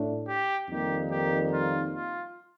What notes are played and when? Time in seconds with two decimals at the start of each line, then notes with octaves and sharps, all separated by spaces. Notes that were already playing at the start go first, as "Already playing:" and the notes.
Already playing: A2 A3 D4
0.27 G4
0.69 F2 D#3 G3 A#3 D#4 G4
1.11 G4
1.53 F4
1.95 F4